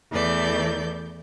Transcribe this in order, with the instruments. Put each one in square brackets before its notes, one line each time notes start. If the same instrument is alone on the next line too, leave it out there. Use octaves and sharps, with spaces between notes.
[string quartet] E2 E3 A3 D5 G6